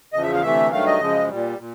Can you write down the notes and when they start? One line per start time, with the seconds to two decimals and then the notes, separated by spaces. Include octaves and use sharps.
0.13 E2 C#3 F3 D#5
0.23 E5
0.33 F5
0.43 D2 C3 E3 A3 E5
0.71 G2 D#3 F#3 A3 F5
0.86 D#5
1.00 F#2 C#3 F3 G#3
1.29 A#2 G3
1.58 A#2